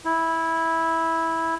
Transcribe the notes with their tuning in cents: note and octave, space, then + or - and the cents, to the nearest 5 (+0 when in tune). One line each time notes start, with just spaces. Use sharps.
E4 -10